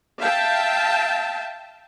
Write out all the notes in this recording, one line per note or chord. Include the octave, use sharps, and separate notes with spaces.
E5 F5 G5 A5